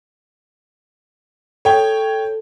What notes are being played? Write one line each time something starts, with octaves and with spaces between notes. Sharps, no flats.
A4 C#5 G5